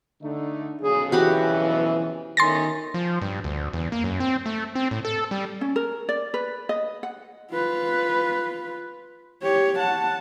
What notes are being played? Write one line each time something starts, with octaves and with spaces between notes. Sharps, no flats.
D3 A3 D#4
B1 F2 C#3 G#4
E3 F#4 G4 B5
G1 D#3 A3 C#4 C6 A6 A#6
F3
G2
D2
E2
A#3
F#2
C4
A3
C4
A2
A4
G3
C#4
A#4
D5
B4
D#5
F#5
F4 B4
G4 C#5
F#5 A5